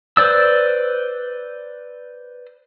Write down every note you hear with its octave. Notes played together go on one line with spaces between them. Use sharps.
B4 C5 D5 E6